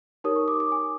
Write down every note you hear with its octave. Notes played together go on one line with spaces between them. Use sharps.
D#4 G4 A#4 C#5 D#6
C#6
D6
D6
G#5